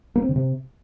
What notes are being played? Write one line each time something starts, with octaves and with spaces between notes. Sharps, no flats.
A#3
C4
C#3
C3